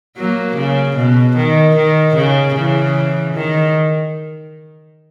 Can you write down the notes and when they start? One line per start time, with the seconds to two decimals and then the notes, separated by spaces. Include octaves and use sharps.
0.17 F#3 A#3
0.57 C#3
0.97 B2
1.37 D#3
1.76 D#3
2.16 C#3
2.55 C#3 E3
3.34 D#3